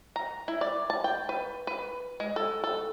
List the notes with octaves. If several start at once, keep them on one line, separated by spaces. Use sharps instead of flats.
A#5
E4
D5
A5
G5
B4
B4
G#3
A4
A4